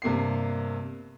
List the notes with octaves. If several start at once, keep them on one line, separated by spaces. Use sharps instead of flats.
G2 C3 A#3 B3 C7